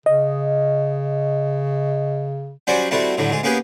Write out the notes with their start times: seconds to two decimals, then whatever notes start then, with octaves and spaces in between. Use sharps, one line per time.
0.06 C#3 D#5
2.67 F#3 G3 C#4 F#4 C5 D5
2.91 G3 A3 C4 E4 F#4
3.17 A2 D3 F#3 G3
3.30 D2 G#2 G#4
3.43 A#3 B3 C#4 G4 G#4 B4